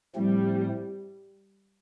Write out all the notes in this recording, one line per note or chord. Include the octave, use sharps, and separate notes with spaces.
A2 F3 G3 A3 C4